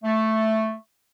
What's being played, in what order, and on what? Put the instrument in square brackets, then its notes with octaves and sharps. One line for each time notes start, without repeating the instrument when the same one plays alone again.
[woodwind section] A3